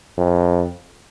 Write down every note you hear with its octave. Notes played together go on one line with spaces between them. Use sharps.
F2